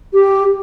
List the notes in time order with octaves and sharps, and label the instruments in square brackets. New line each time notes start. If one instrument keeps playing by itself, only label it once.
[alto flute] G4